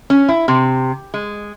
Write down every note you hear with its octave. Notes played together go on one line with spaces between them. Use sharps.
C#4
E4
C3
G#3